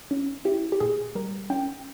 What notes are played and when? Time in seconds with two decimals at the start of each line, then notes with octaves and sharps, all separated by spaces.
0.11 C#4
0.45 E4 G4
0.72 G4
0.80 A#2 G#4
1.15 G3 A#4
1.50 C#4 G5